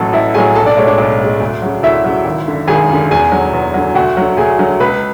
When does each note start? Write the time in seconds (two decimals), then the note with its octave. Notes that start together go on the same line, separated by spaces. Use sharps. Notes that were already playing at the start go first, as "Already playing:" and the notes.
Already playing: A1 A2 F#3 A4 A5
0.13 A1 E4 E5
0.34 A2 F#3 G#4 G#5
0.55 B1 A4 A5
0.66 D4 D5
0.77 A2 G#3 C#5
0.87 D4 D5
0.98 B1
1.20 A2 G#3
1.41 D2
1.62 C#3 F#3
1.83 D2 E4 E5
2.04 C#3 F#3
2.25 G#1
2.47 F#2 D3
2.68 G#1 G#4 G#5
2.90 F#2 D3
3.11 E2 G#4 G#5
3.32 D3 F#3
3.53 E2
3.74 D3 F#3
3.95 D2 F#4 F#5
4.17 D3 F#3
4.37 D2 G#4 G#5
4.59 D3 F#3
4.80 C#2 B4 B5